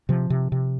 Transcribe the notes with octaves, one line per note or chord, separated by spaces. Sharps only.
C3 F3
C3
C3